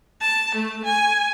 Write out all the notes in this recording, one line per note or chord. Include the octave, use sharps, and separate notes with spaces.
A5
A3
G#5